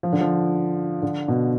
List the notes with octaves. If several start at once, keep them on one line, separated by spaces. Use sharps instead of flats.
F3
D3
F3
D3
B2